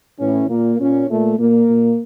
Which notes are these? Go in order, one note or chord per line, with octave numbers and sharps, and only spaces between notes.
A2 E3 C#4
A#2 A#3
A#2 C#4
A#2 A3
A#2 A#3
A#2